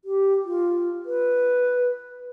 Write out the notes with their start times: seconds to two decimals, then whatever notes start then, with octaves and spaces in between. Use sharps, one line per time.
0.05 G4
0.45 F4
1.06 B4